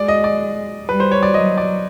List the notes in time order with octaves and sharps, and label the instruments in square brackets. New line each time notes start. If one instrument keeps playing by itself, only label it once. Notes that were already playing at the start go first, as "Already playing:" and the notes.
Already playing: [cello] G#3 [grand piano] D5
[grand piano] D#5
D5
[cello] G3 [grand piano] B4
[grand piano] C5
C#5
D5
[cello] F#3 [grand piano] D#5
[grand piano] D5